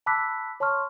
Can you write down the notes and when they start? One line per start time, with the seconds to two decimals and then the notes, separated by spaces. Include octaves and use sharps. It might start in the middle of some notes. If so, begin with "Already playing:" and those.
0.06 A5 B5 D6 E6 F#6 B6
0.60 C#5 A5 C6 C#6 F6